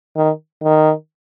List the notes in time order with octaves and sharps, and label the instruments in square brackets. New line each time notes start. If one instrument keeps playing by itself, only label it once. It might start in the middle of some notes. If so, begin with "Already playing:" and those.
[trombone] D#3
D#3